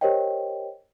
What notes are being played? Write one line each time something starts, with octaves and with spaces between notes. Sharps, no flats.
G4 A#4 C5 C#5 D#5 G5